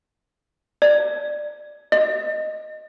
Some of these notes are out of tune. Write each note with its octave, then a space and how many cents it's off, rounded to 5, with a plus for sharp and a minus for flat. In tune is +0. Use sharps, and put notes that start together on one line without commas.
D5 +20
D#5 -10